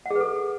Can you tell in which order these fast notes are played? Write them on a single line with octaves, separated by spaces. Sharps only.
F#5 G#4 B4 A4